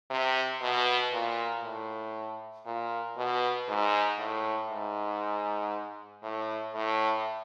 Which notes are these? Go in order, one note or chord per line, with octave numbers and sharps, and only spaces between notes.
C3
B2
A#2
A2
A#2
B2
G#2
A2
G#2
A2
A2